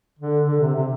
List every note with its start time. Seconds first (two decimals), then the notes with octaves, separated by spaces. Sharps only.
0.19 D3
0.47 D3
0.61 C3
0.75 C3